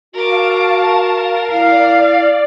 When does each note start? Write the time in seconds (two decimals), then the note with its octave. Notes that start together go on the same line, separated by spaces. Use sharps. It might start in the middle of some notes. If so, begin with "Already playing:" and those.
0.14 F#4 A#4 F5 A5 D6
0.83 A#4
1.51 E4 D5 F5